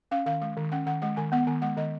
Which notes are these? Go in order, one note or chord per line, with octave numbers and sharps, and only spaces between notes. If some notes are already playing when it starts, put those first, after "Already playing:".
C#4 F5
D#3 F5
G#3 F5
D#3
C#4 F#5
D#3 F#5
G#3 F#5
D#3 G#5
B3 F#5
D#3 G#5
G#3 F#5
D#3 D#5